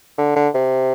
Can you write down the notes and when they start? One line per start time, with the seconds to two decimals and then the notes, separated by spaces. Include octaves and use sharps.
0.18 D3
0.36 D3
0.55 C3